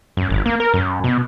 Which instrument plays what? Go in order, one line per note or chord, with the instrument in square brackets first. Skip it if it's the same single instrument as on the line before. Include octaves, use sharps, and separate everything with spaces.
[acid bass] F#2
G#1
A#3
A#4
F#2
B2